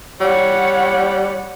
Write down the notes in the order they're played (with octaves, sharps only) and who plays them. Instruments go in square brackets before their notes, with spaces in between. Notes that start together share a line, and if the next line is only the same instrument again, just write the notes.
[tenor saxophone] G3 [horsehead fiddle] C#5 F#5